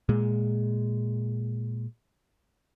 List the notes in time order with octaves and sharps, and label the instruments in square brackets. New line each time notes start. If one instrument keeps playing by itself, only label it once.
[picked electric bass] A#2 G#3